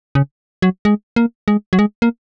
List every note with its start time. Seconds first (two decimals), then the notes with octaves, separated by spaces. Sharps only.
0.15 C#3
0.62 F#3
0.85 G#3
1.16 A#3
1.48 G#3
1.73 F#3
1.79 G#3
2.02 A#3